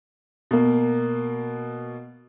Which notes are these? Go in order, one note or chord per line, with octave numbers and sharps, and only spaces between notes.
B2 A#3